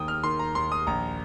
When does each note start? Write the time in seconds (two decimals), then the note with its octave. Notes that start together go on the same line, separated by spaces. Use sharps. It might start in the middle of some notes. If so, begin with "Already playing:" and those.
Already playing: D#2 D#3 G5 D#6
0.08 F6
0.24 D#3 C6
0.39 A#5
0.55 D#2 C6
0.72 D#6
0.87 A#1 A#5